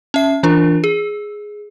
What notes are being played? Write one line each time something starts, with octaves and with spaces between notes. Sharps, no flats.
C#4 E5 C7
E3 D4 F4 A#4
G#4